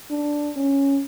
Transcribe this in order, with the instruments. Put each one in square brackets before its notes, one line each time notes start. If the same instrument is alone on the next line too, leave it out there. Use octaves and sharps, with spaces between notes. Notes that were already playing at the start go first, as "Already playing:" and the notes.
[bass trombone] D4
C#4